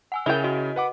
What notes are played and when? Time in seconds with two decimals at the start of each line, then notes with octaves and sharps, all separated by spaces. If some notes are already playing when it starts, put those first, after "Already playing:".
0.12 F#5 G#5 E6
0.26 C#3 E4 A#4 G5 F7 G7
0.44 F#4 D#5
0.76 B4 F#5 D6